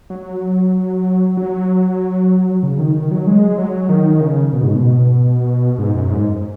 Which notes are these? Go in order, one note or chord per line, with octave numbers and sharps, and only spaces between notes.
F#3
F#3
C#3
D#3
D#3
F#3
G#3
F#3
D#3
D#3
C#3
B2
G#2
B2
G#2
F#2
G#2